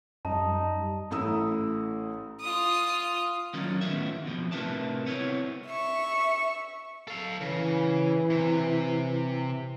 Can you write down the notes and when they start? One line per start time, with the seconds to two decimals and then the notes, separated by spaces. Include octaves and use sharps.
0.25 F#2 G3 D#4 A5
1.11 A1 A3 E4 A#5 D#6 E6
2.41 F4 D#6
3.53 D#3 F#3 A#3 C#4 F4
3.81 A2 D#3 B3 C#4 E5
4.26 F2 B2 F3
4.52 A2 C3 A#4 B4 E5 A5
5.06 B3 C4 E4 C#5
5.67 E5 C#6
7.08 A4 F5
7.41 C#3 E3
8.30 C3